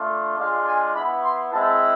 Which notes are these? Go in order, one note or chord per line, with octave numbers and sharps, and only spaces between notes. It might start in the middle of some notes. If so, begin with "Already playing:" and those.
Already playing: A3 D4 F4
G#3 D4 F4 F5
G#5
B3 E4 B5
C6
G#3 C4 E4 A5